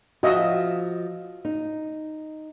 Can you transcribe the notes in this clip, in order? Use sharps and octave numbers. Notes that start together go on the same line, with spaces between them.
F3 F#4 D#5 E5
D#4